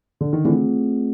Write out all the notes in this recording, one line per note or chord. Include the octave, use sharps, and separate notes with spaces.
D3
D#3
D3 E3 A3 C4 F4 G#4